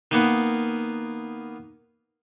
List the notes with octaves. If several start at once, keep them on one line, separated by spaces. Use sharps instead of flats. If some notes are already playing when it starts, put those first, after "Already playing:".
D#3 A#3 B3